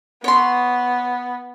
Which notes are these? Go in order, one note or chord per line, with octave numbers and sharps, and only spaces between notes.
B3 C#5 C6